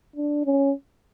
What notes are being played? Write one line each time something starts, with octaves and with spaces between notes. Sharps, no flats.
D4
C#4